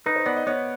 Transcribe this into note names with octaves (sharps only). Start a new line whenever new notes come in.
D#4 B4
C5
B3 D5
D#5
B3 C#5